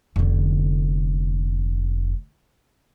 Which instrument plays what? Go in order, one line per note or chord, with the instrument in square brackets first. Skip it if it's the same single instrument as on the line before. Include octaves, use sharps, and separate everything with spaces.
[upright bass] F1 D3